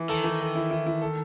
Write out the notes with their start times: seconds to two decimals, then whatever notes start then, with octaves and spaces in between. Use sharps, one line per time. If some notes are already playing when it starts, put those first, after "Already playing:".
Already playing: E3
0.09 D#3 A4
0.24 E3
0.41 A4
0.56 E4
0.71 E4
0.86 E4
1.02 A4